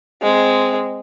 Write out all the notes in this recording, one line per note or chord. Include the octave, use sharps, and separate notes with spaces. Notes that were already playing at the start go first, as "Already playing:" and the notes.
G#3 C4